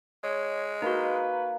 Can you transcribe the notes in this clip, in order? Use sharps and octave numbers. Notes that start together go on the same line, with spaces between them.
G#3 C#5
A#3 D#4 F#4 B4